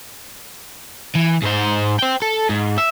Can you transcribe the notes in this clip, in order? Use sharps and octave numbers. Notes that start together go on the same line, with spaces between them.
E3
G#2 C5
C5 G5
A4
G#2
E5